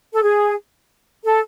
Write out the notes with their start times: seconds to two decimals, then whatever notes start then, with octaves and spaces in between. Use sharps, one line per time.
0.13 A4
0.22 G#4
1.24 A4